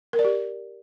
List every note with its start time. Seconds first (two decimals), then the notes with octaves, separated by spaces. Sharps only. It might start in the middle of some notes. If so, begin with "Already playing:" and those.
0.13 A#4
0.19 D5
0.25 G4